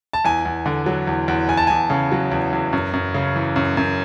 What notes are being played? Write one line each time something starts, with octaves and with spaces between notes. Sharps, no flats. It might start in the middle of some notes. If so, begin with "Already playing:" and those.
A5
E2 G#5
E2
D3
F#3
E2
E2
E2 G#5
A5
E2 G#5
C#3
F#3
E2
E2
F#2
F#2
C#3
E3
F#2
F#2